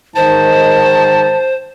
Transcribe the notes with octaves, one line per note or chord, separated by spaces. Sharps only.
G#2 D#3 C5 A5